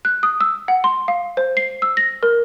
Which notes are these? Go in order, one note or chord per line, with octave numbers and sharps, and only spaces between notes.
F#6
D#6
E6
F#5
C6
F5
C5
C7
E6
A#6
A#4